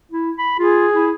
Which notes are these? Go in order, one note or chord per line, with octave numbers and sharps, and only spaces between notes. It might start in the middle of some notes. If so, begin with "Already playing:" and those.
E4
B5
F4 G#4
E4